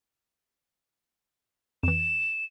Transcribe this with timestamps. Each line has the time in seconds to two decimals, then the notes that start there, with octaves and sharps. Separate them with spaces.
1.83 F2 E3 E7